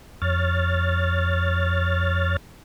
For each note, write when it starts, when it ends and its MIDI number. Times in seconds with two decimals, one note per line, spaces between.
0.22 2.37 41
0.22 2.37 73
0.22 2.37 89
0.22 2.37 93